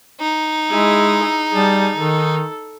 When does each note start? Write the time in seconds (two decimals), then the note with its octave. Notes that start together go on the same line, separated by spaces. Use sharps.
0.20 D#4
0.70 G#3 E4 G#4
1.52 G3 G#4 A5
1.97 D#3 A4